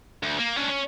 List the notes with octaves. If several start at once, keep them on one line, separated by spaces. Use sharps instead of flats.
D2
A#3
C#4 D4
C#4